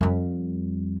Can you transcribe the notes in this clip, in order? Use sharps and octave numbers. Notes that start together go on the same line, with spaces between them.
F2 G3